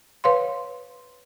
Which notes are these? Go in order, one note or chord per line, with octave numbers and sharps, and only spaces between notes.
B4 C#5 F5 C6